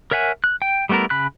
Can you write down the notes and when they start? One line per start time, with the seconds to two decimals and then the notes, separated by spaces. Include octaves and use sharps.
0.11 A#4 C#5 E5 F#5 G#5
0.44 F#6
0.62 G5
0.89 G3 A3 B3 E4 A#4
1.10 C#3 B5 F#6